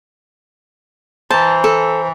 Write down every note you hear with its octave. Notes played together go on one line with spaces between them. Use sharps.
E3 C5 A5 A#5
A4